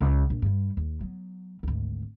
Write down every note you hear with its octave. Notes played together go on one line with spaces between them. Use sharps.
C#2
A#1
G2 G3
D#2
F#3 B3
G#1 D2